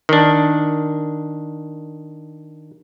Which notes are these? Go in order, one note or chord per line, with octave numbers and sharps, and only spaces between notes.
D#3 D4